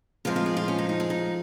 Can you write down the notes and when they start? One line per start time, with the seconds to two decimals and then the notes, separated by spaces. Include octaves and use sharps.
0.25 F2 F3 G#3 F4
0.36 F4
0.46 G#4
0.57 F4
0.68 C#4
0.79 D#4
0.89 D#4
1.00 G#4
1.10 D#4